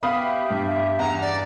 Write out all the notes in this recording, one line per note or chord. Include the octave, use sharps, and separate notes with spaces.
B3 G4 E5 F5 B5 D#6
G2
E2 A#5
D5